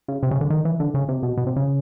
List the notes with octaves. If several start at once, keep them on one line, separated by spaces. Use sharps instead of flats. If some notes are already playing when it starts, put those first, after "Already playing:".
C#3
C3
C#3
D3
D#3
E3
D3
C#3
C3
B2
B2
C3
C#3